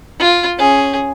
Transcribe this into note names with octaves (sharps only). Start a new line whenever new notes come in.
F4
C#4 G#4